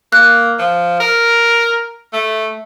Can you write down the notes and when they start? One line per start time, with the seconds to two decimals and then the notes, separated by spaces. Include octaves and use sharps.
0.12 A#3 F#6
0.59 F3
1.00 A#4
2.13 A3